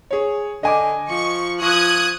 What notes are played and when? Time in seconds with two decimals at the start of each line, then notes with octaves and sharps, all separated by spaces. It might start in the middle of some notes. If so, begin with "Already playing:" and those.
0.11 G#4 C#5
0.63 D3 D#5 G#5 D6
1.10 F3 C#6
1.62 F3 C#6 D#6 F#6 G#6